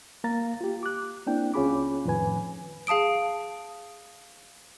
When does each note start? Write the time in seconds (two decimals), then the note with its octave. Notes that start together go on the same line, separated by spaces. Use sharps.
0.24 A#3 F5 A#5 A6
0.61 F4 G4
0.83 D6 F#6
1.27 A#3 C4 D4 E4 G5
1.54 C#2 C#4 F4 G#4 B5 D6
2.06 F2 A2 D#3 B4 G#5
2.87 G#4 F5 A5 D#6 D7